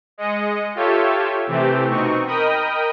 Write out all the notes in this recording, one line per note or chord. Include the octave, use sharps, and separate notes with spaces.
G#3 D#5 C#7
F4 G4 A4 C#5 E5
C3 E3 A3 C4 G4
B2 C4 D#4 C#6
A#4 D#5 G5 B5 D#6